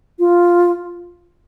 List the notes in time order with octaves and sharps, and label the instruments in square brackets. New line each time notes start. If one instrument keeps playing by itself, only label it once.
[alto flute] F4